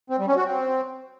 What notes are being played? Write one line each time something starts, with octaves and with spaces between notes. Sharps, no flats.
C4
G3
C#4
F#4
C4